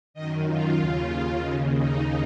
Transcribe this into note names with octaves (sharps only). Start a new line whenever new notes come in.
F#2 D#3 D#5
F4
D#2 C#3 F4
D#2 C#3 D#4
D#4